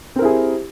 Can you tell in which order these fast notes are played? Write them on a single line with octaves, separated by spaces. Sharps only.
C4 A#4 E4 G#4 G4